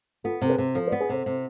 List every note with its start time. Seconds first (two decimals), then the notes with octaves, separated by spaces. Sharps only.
0.24 B3 F4 A4
0.42 C3 A4
0.49 G#4 B4
0.58 C3
0.75 F3 A4 C5
0.87 B4 D5
0.92 B3
1.00 G#4 B4
1.09 C3 A4 C5
1.26 C3